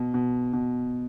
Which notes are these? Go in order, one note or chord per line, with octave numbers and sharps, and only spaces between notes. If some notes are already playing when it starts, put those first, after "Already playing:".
Already playing: B2
B2
B2